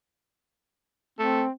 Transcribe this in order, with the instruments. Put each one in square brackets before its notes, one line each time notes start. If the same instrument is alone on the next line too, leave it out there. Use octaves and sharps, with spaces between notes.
[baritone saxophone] A3 [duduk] C4